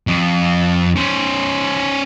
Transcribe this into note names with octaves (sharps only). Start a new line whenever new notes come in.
F2
C#4 C5